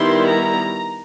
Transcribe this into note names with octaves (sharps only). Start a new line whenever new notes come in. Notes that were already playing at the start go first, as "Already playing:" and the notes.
Already playing: D#3 G3 B3 E4 C6
A#5